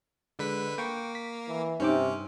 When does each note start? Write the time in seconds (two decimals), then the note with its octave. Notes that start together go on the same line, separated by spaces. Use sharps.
0.39 D3 G#3 B4 B6
0.78 A#3 G5 C#6
1.15 B6
1.48 E3
1.80 G2 C3 C#4 D#4 C5 D6